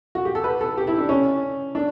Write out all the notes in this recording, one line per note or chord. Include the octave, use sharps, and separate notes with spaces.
F#4
G4
A4
B4
A4
G4
E4
D4
C#4
D4